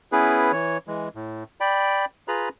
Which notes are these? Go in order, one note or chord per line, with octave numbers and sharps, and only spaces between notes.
B3 C#4 E4 G#4 B4
E3 C#5
E3 G#3
A2
D5 G5 B5
F4 G#4 B4 A#5 B5